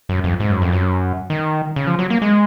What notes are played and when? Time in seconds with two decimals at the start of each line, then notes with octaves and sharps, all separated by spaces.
0.09 F#2
0.24 F2
0.40 G#2
0.51 F#2
0.62 F2
0.72 F#2
1.30 D#3
1.76 C#3
1.87 F3
1.99 F#3
2.10 A#3
2.22 G#3